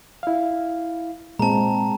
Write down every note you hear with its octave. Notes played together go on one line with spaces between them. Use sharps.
E4 F5
A#2 G#3 C4 A5 A#5